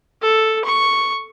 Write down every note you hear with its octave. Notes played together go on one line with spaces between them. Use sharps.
A4
C#6